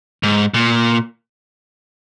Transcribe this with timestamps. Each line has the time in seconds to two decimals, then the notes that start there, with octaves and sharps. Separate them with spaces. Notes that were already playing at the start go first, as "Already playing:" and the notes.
0.23 G#2
0.54 A#2